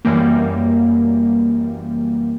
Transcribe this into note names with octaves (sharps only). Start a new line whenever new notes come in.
F#2 E3 G3 A#3